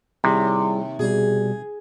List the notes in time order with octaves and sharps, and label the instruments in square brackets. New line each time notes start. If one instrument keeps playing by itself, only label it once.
[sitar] D#2 [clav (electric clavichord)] C3 [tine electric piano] G3 E4 G#4
[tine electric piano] B2 G3 [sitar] G#4